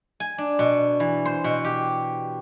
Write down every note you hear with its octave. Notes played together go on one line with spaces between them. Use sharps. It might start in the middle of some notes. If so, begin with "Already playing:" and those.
G#5
D4
B2
E3
C5
B2
G4